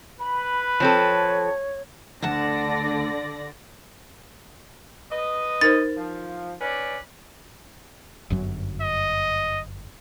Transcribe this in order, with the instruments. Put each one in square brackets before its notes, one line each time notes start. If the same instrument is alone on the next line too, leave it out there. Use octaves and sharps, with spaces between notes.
[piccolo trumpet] B4 [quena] B5
[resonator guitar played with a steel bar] F3 C4 A4 [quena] C#5
[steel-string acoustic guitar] D2 F#5 A5 [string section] D3 D5 A#6
[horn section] B4 D#5
[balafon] D#4 A#4 C5 [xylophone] A6
[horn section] F3
C#4 B4 D5
[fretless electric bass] G1 F#2 F#3
[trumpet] D#5